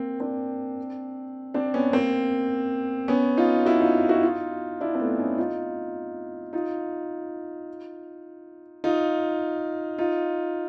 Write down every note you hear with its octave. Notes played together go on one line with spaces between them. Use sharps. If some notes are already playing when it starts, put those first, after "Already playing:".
Already playing: A#3 C4
C4 D4
C4 D4
B3 C#4
A#3 C4
B3 C#4
D#4 F4
E4 F#4
D#4 F4
E4 F#4
D#4 F4
D4 E4
C4
A3 B3
C#4 D#4
D#4 F4
D#4 F4
D#4 F4
D#4 F4